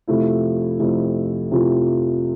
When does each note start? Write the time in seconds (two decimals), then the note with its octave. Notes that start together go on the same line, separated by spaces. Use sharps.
0.08 F2 C3 F3 A3 E4
0.79 F2 C3 F3 A3 E4
1.50 F2 C3 F3 A3 E4